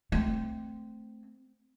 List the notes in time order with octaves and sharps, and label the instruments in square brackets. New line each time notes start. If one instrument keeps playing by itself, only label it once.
[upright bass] A3 C4